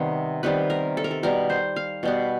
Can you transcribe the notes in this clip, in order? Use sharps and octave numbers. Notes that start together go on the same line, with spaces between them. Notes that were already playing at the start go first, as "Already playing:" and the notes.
Already playing: C3 D#3 G3 B3
C3 D#3 G3 B3 B4
A#4
A4
A#4
A4
B2 G3 B3 A#4
C5
F5
B2 G3 B3